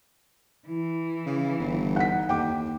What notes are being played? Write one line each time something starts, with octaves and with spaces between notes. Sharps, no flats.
E3 E4
C#3 F5
G1 G3
D#4 F#5 B6
D#2 G5 D6